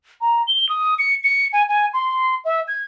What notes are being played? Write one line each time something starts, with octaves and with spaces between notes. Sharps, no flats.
A#5
G7
D#6
C#7
C#7
G#5
G#5
C6
E5
G#6